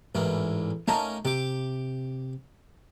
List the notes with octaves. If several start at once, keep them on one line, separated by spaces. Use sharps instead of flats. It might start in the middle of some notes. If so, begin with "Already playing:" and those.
A1 E2 G#2 A#3
A3 A#3 C#4 D#4 A5 A#5
C3 G4 D6